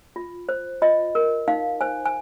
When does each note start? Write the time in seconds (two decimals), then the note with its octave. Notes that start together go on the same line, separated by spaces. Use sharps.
0.16 F4
0.49 C5
0.82 F4 D#5
1.15 A#4
1.48 D#4 F5
1.81 C5 G#5
2.05 G#5